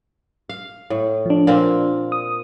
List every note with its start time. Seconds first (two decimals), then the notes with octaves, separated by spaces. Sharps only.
0.49 F5
0.90 A2
1.26 F3 D4
1.47 A#2 A#3 C4
2.12 D#6